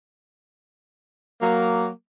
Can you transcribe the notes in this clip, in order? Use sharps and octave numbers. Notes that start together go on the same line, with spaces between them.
F#3 A#3